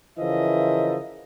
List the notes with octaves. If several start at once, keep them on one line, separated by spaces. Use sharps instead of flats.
C#3 E3 F3 A#4 D#5 E5